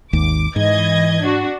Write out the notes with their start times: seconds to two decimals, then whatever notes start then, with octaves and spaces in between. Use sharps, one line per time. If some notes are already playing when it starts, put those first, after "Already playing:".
0.13 G#1 D#2 D6
0.56 G#2 E3 D#5 G#6
1.22 D4 F#4